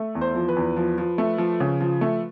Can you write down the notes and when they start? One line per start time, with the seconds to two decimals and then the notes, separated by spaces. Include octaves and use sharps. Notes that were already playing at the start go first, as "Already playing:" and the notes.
Already playing: A3
0.15 E2
0.21 C5
0.35 F3
0.49 B4
0.56 E2
0.76 F3
0.98 F3
1.18 A3
1.38 F3
1.60 C#3
1.80 F3
2.01 A3